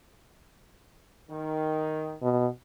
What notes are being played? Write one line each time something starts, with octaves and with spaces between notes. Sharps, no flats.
D#3
B2